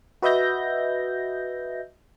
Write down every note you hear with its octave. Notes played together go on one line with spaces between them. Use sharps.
F#4 B4 D#5 E5 G6 A#6